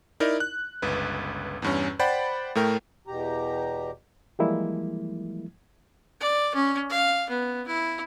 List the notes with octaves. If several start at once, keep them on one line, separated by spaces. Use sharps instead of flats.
D#4 E4 A#4 D5
F#6
G1 C#2 B4
E2 G2 C#4
C5 D5 F#5 G5 B5 A6
A2 A3 A#4 G5
E2 B2 G4 A#5
E3 F3 G3 G#3 A#3 E4
D5
C#4
F5
B3
E4